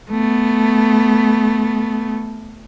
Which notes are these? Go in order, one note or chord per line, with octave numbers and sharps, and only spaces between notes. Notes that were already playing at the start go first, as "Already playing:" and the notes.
A3 B3